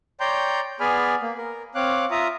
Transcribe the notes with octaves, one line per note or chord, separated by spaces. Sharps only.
C#5 D5 G5 A#5 C6 G6
B3 G#4 D5 G#5 B5 F6
A#3
A#4
C4 C#5 F5 D6 F#6
F4 E5 A#5 D#6